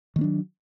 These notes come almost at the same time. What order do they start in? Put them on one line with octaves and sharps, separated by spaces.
D#3 A#3 D4 F#3